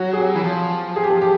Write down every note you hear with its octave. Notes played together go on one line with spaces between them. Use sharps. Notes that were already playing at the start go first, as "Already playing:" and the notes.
Already playing: F#3 F#4
G#4
G4
E3
F3
G#4
G4
G#4
G4